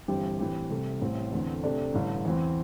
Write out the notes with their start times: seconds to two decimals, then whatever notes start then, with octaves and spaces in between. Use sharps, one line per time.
0.08 G1 G2 E3 C4 G4
0.39 A2 E3 C4 G4
0.70 C2 C3 A3
1.01 A1 A2 G3 C4
1.32 E2 D3 A3 C4
1.63 C3 A3 D4
1.94 A1 G2 D3
2.25 E2 E3 C4